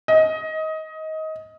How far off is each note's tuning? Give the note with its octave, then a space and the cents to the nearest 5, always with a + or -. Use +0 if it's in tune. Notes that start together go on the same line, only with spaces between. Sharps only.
D#5 +20